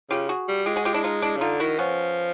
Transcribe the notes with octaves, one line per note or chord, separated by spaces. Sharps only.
C#3 F4 G4
F#4 G#4
G3
G#3 F4 G4
F#4 G#4
F4 G4
D4 E4
D#4 F4
D4 E4
C#3
D3 D#4 F4
D#3 E4 F#4
F3 B3 C#4